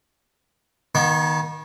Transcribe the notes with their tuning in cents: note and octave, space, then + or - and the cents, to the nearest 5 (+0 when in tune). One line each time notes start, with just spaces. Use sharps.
D#3 +0 B3 -40